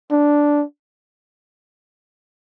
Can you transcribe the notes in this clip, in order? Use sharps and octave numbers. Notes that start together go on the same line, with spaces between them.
D4